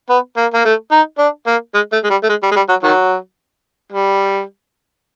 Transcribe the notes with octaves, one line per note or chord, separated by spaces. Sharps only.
B3
A#3
A#3
A3
D#4
D4
A#3
G#3
A3
G#3
G3
A3
G#3
G3
G#3
G3
F#3
D#3 F#3
G3